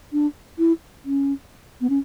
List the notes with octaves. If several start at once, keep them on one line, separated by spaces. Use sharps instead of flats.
D4
E4
C#4
B3
C#4